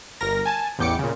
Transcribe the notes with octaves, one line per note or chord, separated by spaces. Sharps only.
G1 A#4 A#6
G#5 A5
A1 E2 G5 D6 C#7
A#2 C#3